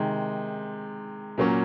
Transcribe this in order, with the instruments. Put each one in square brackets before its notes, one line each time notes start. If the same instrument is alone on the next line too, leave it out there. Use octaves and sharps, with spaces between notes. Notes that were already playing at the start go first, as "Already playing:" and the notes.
Already playing: [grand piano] C3 D#3 G#3
A#2 F#3 A#3 C#4